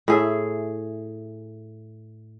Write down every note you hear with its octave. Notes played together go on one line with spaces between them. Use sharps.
A2 G#4 E5